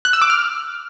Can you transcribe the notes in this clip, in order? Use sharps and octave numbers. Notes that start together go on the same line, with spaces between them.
F#6
E6
D6
F6